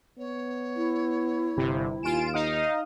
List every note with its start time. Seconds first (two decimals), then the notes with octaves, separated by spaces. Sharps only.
0.18 B3 C#5
0.76 E4
1.57 G1 C3
2.03 D#2 F4 G#5 D7 E7
2.34 D#4 D#5 F5 D#6